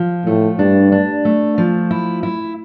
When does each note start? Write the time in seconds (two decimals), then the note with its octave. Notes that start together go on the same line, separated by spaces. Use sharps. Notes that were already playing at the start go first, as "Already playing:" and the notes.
Already playing: F3
0.26 A2 A3
0.59 G2 D4
0.92 D4
1.25 A3
1.58 F3
1.91 E4
2.23 E4